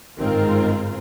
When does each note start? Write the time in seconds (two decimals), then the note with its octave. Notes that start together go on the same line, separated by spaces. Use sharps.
0.18 G1 G#2 D#3 G#3 C4 F4 A#4